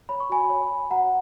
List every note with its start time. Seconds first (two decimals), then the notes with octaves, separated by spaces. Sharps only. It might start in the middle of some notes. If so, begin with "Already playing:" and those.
0.09 C#5 B5
0.20 C#6
0.30 F#4 G#5 B5
0.49 C#5
0.70 C#5
0.91 F#4 F#5 A#5